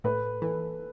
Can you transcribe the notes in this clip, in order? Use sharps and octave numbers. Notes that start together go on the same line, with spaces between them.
A2 A4 B4
E3 A4 B4